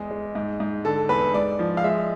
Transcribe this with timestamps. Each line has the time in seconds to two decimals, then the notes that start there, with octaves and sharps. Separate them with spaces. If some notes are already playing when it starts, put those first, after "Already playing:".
Already playing: E2 G#3
0.11 G#3
0.35 G#2
0.60 G#2
0.85 D3 A4
1.09 E2 B4
1.34 G#2 D5
1.59 F3
1.77 F5
1.84 G#3 E5